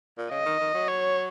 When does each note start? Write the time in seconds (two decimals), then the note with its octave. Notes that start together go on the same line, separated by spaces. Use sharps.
0.18 A#2
0.31 C#3 D#5
0.46 D#3
0.60 D#3
0.74 F#3
0.88 C#5